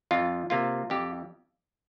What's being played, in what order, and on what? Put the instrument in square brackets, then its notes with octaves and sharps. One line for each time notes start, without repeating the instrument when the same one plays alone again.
[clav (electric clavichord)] F2 F4
C3 A#3 F4
F2 G4